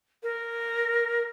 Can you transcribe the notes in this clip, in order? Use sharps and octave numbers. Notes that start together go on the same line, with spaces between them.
A#4